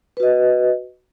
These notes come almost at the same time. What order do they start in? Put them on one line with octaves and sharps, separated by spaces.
B4 F#4 D#5